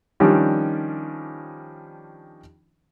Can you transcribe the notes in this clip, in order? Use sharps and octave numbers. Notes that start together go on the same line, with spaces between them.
D#3 F3 G3 C#4 D4